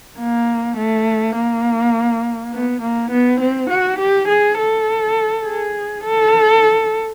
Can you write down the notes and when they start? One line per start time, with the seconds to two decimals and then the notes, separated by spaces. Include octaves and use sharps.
0.19 A#3
0.77 A3
1.36 A#3
2.53 B3
2.82 A#3
3.11 B3
3.41 C4
3.70 F#4
3.99 G4
4.29 G#4
4.58 A4
5.45 G#4
6.04 A4